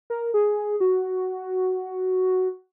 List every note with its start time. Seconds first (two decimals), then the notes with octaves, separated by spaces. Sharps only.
0.10 A#4
0.34 G#4
0.80 F#4